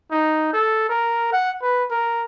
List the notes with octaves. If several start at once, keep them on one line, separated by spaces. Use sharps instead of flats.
D#4
A4
A#4
F#5
B4
A#4